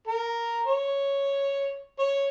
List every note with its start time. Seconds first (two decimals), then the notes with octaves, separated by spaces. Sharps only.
0.07 A#4
0.66 C#5
1.99 C#5